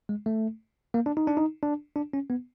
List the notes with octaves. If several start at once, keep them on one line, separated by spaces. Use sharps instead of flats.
G#3
A3
A#3
D4
D#4
D4
D#4
D4
D4
C#4
B3